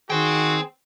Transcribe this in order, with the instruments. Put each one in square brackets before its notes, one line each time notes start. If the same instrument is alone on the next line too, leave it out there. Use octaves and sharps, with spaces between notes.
[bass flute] D#3 [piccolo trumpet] F#4 [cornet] G#4 [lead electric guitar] C5 G5